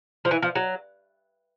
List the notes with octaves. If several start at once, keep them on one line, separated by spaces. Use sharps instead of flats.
F3
E3
F3
F#3